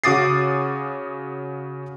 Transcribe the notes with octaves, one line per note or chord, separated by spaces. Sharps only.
C#3 F#4 D6 D#6 A6 C7